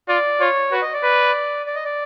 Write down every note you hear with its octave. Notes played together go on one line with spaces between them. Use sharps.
F4 D5
F4 C#5
F#4 B4
D#5
D5
B4
D5
D#5
D5